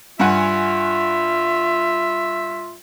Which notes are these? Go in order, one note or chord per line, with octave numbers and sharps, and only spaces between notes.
G2 F4 E5 F#5 G#5